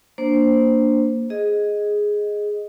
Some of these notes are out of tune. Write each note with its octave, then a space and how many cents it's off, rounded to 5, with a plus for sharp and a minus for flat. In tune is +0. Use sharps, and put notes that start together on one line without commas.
A#3 +0 D4 +0 C5 +0
G#4 +0 D#5 +0